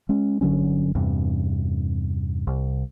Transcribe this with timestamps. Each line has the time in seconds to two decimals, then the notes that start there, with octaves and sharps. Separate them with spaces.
0.09 G#3 C#4
0.41 G1 D3 F#3 C#4
0.95 E2 G2 C3
2.47 C2